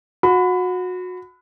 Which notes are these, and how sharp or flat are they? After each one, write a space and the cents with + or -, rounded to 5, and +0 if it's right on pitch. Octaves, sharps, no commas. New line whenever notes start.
F#4 -25 B5 +25